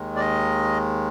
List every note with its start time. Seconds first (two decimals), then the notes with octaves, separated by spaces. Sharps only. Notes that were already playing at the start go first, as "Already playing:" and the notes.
Already playing: D#2 D#3 G#3
0.16 D5
0.20 D#5